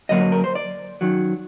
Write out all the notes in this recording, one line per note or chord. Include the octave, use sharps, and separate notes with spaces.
F#2 D3 F#3 A#3 D#5
A#4
C5
D5
F#2 D#3 F#3